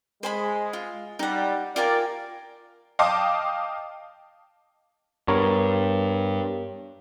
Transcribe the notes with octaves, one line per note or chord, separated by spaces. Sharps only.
G#3 C5 G#5 B5
F4
G3 D#4 F#5
F4 G4 A#4 D5 G#5
D#5 F5 G5 A5 D6 D#6
G2 B3 A#4 C#5